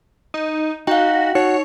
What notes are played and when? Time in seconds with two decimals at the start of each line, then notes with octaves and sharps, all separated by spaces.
0.34 D#4
0.87 D#4 F#4 F5 G5
1.35 D#4 F#4 C#5